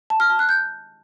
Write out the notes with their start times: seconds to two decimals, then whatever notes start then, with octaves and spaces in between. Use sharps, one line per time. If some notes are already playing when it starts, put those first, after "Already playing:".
0.10 A5
0.20 F6
0.30 A5
0.39 F#6
0.49 G6